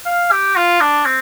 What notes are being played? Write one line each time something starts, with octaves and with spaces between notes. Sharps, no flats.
F5
G4
F4
D4
C4